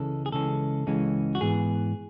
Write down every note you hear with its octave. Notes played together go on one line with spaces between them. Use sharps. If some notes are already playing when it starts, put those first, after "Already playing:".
Already playing: C#2 C#3 E3 G#3 C#4 A4
G#4
C#2 C#3 E3 G#3 C#4 A4
C#2 C#3 E3 G#3 C#4
F#4
G#2 E3 B3 G#4